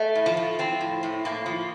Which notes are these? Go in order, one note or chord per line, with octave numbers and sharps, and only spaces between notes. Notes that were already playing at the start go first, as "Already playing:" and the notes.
Already playing: A3
A2
F3
F3
F3 C4
A2
A2
A2 A#3
F3